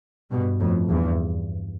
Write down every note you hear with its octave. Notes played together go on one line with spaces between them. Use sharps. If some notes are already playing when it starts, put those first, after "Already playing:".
G2 B2
F2 A2
E2 G2